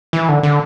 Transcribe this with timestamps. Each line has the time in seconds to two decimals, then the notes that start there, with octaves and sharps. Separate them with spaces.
0.13 E3
0.29 D3
0.43 D3